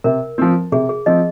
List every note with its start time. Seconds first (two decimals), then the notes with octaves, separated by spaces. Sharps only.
0.04 C3 A#4
0.38 F3 C4
0.72 C3 G#4
0.89 G#4
1.06 F3 C4 D#5